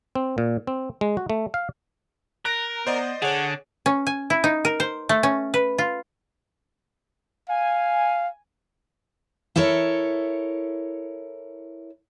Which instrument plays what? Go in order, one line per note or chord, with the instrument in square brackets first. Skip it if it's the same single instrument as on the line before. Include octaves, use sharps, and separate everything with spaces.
[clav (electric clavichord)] C4
A#2
C4
G#3
F#4
A3
F5
[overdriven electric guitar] A#4 [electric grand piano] F#6 A#6 D7
[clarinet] B3 [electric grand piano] C5 D5 D#5
[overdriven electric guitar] D3 [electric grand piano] G#4 C#5 [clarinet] F#5
[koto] C#4
G#5
E4
D#4
A#4
C5
A3
C#4
B4
F4
[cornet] F5 [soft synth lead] G#5
[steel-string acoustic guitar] E4 A4 A#4 C#5